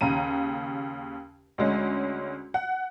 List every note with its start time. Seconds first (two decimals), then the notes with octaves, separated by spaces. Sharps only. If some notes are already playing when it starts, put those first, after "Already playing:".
0.01 D#2 C#3 A#5 D#7
1.58 D2 G#3 C#4
2.54 F#5